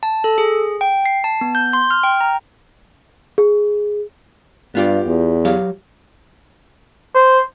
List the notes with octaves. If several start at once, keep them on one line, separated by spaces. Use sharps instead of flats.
A5
A4
G#4
G5
C7
A5
B3
G6
C6
F6
G5
A#5
G#4
G2 B3 F4 G4
E2
F#3 G4 F5
C5